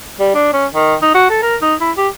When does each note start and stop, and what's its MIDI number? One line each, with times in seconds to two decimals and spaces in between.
0.20 0.32 55
0.35 0.52 62
0.53 0.66 61
0.74 0.95 51
1.02 1.13 63
1.15 1.26 66
1.30 1.38 69
1.42 1.56 70
1.62 1.75 63
1.80 1.91 64
1.97 2.08 67